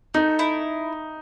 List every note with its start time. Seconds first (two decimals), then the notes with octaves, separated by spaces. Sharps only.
0.14 A3 D#4
0.39 E4